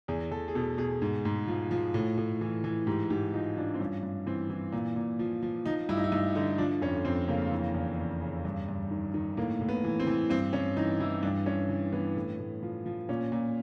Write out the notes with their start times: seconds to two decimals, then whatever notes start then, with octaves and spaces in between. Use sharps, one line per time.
0.08 E2 G#4
0.31 E2 A4
0.48 G#4
0.55 B2 A4
0.78 B2 G#4
1.02 G#2
1.25 G#2
1.48 F3
1.71 F3
1.94 A2
2.18 A2
2.41 E3
2.64 E3
2.87 G#2 G4
3.10 G#2 G4
3.34 F3 D#4
3.57 F3 D4
3.74 C4
3.80 G2 C#4
4.03 G2
4.26 E3 C4
4.50 E3
4.72 A#2
4.96 A#2
5.19 F3
5.42 F3
5.65 F3 D#4
5.89 G2 E4
5.97 D#4
6.04 E4
6.12 G2 D#4
6.35 D3 D#4
6.58 F3 D4
6.82 F2 C#4
7.05 F2 C4
7.28 C#3 A#3
7.51 E3
7.74 E2
7.99 E2
8.21 C#3
8.45 G2
8.68 G2
8.91 D#3
9.14 D#3
9.37 A2 A#3
9.61 A2
9.69 B3
9.84 E3
10.00 C4
10.07 E3
10.30 G2 C4
10.53 G2 C#4
10.77 E3 D#4
11.00 E3 E4
11.23 G2 D4
11.46 G2 C#4
11.69 E3
11.93 E3 B3
12.16 A2
12.39 A2
12.63 F3
12.86 F3
13.09 A#2 C#4
13.32 A#2